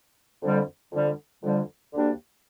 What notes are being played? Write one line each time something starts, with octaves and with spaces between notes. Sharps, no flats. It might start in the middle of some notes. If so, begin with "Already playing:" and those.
F2 D3 G3
F2 D3 G3
F2 D3 G3
D2 D3 G3 A#3 D4